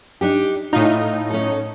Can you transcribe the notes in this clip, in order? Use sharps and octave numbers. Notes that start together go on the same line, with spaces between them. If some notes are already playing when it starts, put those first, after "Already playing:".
D4 D#4 G4
A2 D#4 F4
C#4 A4